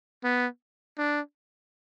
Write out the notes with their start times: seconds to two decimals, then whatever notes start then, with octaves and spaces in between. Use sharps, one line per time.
0.24 B3
0.98 D4